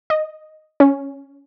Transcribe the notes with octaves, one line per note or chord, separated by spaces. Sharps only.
D#5
C#4